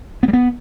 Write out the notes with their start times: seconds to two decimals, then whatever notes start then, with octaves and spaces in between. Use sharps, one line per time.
0.23 B3
0.28 G3
0.33 B3